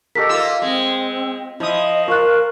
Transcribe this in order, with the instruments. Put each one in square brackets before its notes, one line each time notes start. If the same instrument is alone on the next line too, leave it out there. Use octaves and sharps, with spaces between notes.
[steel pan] G4 A4 A#4 [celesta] D#5 B6
[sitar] A#3 F4 [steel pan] E6
[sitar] G#3 [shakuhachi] C4
[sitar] F3 [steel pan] E4 D#6 [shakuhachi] D#5
[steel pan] F4 [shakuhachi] A#4 [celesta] C#6 F#6